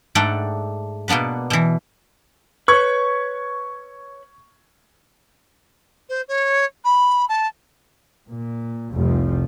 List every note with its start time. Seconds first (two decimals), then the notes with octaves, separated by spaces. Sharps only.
0.15 G#2 A3 D4 F#5 G5
1.08 B2 A#3 B3 D4 B4
1.50 B2 E3
2.68 B4 C#5 C#6 G#6
6.09 C5
6.28 C#5
6.84 B5
7.29 A5
8.30 A#2
8.93 F1 C2 F3